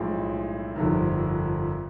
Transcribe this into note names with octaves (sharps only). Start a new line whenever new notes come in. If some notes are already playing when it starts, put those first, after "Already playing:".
Already playing: B1 A2 F3 G#3
G1 F2 C3 D#3